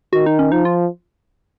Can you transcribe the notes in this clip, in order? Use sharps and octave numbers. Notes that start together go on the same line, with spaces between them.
D#3 F#4
D#4
C#4
F3 D#4
F4